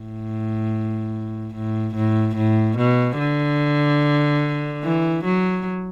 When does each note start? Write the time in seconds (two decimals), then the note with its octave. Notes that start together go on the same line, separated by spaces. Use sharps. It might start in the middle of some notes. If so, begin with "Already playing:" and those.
Already playing: A2
1.54 A2
1.95 A2
2.36 A2
2.77 B2
3.19 D3
4.83 E3
5.24 F#3